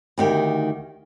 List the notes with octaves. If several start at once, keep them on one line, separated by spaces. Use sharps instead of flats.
D2 D#3 G4